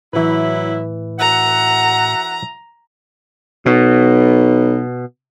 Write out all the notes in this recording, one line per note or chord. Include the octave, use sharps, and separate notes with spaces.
A2 E3 F#3 E4 B4
F#4 E5 F#5 A#5
B1 B2